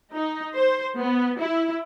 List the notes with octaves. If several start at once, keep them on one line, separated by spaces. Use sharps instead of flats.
D#4
C5
B3
E4